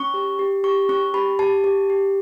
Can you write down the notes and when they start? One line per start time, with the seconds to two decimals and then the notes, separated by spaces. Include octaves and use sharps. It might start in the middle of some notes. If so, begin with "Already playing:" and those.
Already playing: C#4 C#6
0.14 G4
0.39 G4
0.64 G4 C#6
0.89 C#4 C#6
1.14 G4 B5
1.39 G4 A5
1.64 G4
1.90 G4